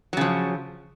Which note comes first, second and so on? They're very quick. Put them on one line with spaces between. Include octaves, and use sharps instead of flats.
F#3 C#3 F3